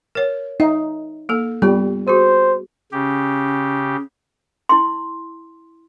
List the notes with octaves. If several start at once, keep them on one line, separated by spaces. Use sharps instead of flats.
A#4 C#5
D#4 E5
A#3 A4
G3 B3 F4
F#4 G#4 C5
C#3 C#4 G4
E4 C6